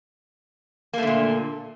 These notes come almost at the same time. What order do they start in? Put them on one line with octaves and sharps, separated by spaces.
A#3 A3 D3 A#2